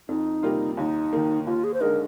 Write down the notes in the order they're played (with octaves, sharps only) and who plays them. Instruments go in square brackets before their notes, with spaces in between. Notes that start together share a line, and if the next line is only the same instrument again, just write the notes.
[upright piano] F2 [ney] D#4
[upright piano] C3 G3 A#3 F4
[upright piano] D#2 [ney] D#4
[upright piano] D#3 A#3
[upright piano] D#2 [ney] F4
[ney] G#4
C5
[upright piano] D3 G#3 D#4 [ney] A#4